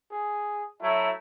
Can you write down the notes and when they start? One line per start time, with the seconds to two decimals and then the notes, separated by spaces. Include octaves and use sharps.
0.11 G#4
0.82 F#3 A3 E4 A#5